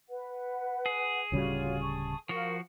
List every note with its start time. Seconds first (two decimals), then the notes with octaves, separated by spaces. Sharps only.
0.09 B4 F#5
0.86 G#4
1.32 D1 C#3 G3 F4 F#4 C#5
1.80 A5 C#6
2.29 F3 F#4 A#4 F5 C#6